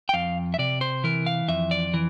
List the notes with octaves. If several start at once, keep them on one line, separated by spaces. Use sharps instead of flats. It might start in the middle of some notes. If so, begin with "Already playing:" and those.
G5
F2 F5
E5
C3 D5
C5
E3 A#4
F5
F2 E5
D5
E3